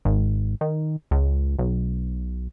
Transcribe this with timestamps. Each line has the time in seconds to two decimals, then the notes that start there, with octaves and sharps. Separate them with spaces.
0.05 G#1
0.61 D#3
1.11 C#2
1.59 B1